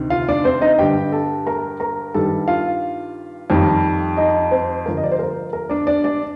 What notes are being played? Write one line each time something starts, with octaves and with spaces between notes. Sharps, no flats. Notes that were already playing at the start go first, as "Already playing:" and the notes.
Already playing: D2 C3 D#3
F4 F5
D4 D5
C4 C5
D#4 D#5
G2 D3 G3 G4 G5
A4 A5
A#4 A#5
A#4 A#5
G2 D#3 G3 A4 A5
F4 F5
F2 D#3 G3
D#4 D#5
C4 C5
G2 D3 F3 A#4
D#5
D5
C5
A#4
A#4
D4 D5
D4 D5
D4 D5